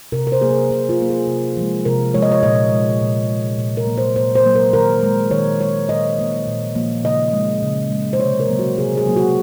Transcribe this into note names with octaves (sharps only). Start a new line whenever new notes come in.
C3 A#4
A#4
C5
F#3 A#3 G#4
A#4
C3 G#4
F4
F#3 A#3
G#4
C3
F3 G#3
C3 A#4
F3 G#3 C#5
D#5
C#5
A#2 D#5
G#3
A#2
G#3
A#2
A#4
F#3 A#3
C5
A#2 C5
C5
F#3 A#3
A#4
D#3 A#4
G#3
D#3 C#5
G#3 C#5
A#2 D#5
F3 A#3
A#2
F3 A#3
C#3 D#5
G#3
C#3
G#3
C5
C3 C#5
A#4
F#3 A#3
F#4
C3 G#4
G#4
F#3 A#3
F#4